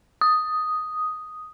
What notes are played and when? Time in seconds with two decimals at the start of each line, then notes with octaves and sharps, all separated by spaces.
0.21 D#6